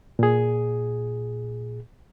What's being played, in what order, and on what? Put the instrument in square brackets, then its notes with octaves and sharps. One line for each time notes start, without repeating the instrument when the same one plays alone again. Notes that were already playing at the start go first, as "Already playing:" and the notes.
[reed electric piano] A#2 G#4